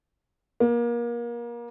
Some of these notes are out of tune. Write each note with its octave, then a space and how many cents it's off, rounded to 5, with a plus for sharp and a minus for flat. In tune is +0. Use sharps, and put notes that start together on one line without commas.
A#3 +30